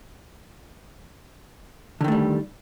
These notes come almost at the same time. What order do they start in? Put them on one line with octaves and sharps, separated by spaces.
D3 D#3 A3 G3